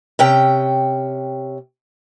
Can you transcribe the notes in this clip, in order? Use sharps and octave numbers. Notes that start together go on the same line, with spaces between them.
C3 C#4 G5